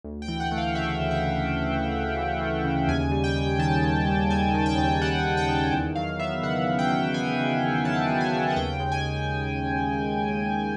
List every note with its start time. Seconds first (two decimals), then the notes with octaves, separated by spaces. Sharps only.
0.04 D2
0.22 G5
0.28 E3
0.40 F#5
0.51 A3
0.58 F5
0.75 C#3 E5
0.99 D2
1.11 E5
1.23 E3
1.46 A3
1.70 C#3
1.93 D2
2.17 E3
2.41 A3
2.64 C#3
2.88 D#2 G#5
3.11 G3
3.24 G5
3.36 D#2
3.59 D#3 A5
3.83 D#2
4.07 G3
4.30 D#2 G#5
4.54 D#3
4.66 G5
4.78 D#2
5.01 G3 F#5
5.25 D#2
5.37 G5
5.48 D#3
5.73 E2
5.95 F#3 F5
6.19 B3 E5
6.43 C#3 F#5
6.67 E2
6.79 G5
6.90 F#3
7.14 B3 G#5
7.38 C#3
7.62 E2
7.85 F#3 A5
8.09 B3
8.21 G#5
8.33 C#3
8.50 F#5
8.56 D#2 G5
8.80 G#3
8.92 G#5